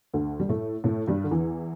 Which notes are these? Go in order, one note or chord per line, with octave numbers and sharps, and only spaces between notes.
D2 D3
G3
A2 A3
A2 A3
G2 G3
D3
E2 E3